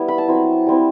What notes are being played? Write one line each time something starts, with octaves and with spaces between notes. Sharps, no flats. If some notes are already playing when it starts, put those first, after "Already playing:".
Already playing: G3 B3 E4
B5
A5
F#3 C4 E4
G3 C4 E4